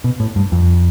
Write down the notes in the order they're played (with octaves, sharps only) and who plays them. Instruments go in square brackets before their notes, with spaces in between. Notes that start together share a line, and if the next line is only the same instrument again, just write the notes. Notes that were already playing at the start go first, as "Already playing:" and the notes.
[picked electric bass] B2
A2
G2
F2